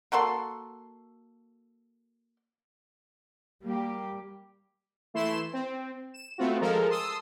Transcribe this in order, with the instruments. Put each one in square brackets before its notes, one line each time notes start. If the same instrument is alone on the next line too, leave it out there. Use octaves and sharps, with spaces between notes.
[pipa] A#3 F#4 A4 C6
[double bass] G3 [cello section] A#3 G4
[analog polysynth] E3 A3 E4 C6 E7
C4
E7
A3 B3 C4 F4 F#4
F3 G#3 A4 A#4
A5 C6 D#6 E6